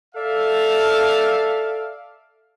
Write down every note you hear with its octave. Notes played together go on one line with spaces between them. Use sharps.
A4 D5 E5 F5